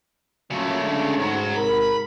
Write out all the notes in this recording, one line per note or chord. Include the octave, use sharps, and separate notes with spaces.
A#2 C#3 F#3 A3 C#4
D3 G#3 C#4
B1 G#2 F#3
G#2 C3 A#4 B5